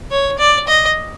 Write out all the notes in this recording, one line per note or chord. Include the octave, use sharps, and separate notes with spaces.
C#5
D5
D#5